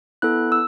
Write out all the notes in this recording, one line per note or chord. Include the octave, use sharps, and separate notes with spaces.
B3 E4 A4 F#6
E6